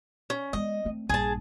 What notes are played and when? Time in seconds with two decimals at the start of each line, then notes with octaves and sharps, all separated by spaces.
0.30 C#4
0.53 G#3 B3 D#5
0.85 A3 C4
1.09 A#1 G2 G#4 A5